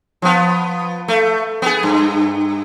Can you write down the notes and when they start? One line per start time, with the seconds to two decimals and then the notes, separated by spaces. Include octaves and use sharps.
0.22 F3 B3
1.08 A3
1.62 B3 G#4
1.83 G2